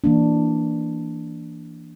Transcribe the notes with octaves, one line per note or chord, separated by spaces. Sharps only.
E3 A#3 D4